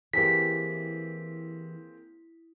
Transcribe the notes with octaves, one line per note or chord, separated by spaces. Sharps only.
E3 A#3 C4 E4 G4 G#4 B6